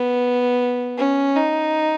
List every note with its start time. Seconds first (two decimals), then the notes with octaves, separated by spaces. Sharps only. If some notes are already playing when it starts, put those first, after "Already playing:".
Already playing: B3
0.97 C#4
1.36 D#4